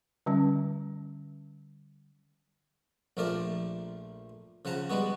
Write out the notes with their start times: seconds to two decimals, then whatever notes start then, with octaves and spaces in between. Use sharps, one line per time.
0.26 D3 G3 C#4
3.17 A#1 F3 A3 A#4 D5 A5
4.65 C#3 F3 F#5 A5 A#5
4.90 G3 G#3 B3 F#4